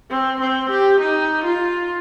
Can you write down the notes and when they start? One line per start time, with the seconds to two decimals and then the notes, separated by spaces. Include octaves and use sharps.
0.11 C4
0.40 C4
0.70 G4
1.00 D#4
1.44 F4